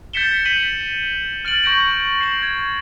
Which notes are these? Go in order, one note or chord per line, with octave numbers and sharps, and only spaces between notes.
G6 A6 B6 C#7 E7 G7
G6 B6 D#7 F#7
F6 A6 D7 F#7
C#6 G6 A#6 D7 F#7
C7 E7 F#7
G#6